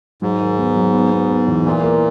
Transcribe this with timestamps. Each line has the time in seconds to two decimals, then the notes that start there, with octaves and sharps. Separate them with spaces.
0.22 G#2 F#3
0.40 D#3
0.58 B3
0.76 F#3
0.93 B3
1.12 B3
1.29 B3
1.48 E2
1.66 A#2 E3
1.83 A#3